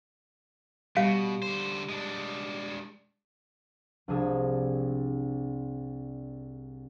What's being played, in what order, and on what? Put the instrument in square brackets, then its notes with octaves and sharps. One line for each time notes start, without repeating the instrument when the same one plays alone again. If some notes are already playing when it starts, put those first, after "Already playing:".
[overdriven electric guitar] B2 [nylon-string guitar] G3 [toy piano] F5
[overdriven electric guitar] D3 C5
G#3 D4
[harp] C2 F3 D4 G#4 E6 E7